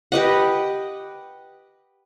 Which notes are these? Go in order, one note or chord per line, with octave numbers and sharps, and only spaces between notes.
G4 B4 D#5 F#5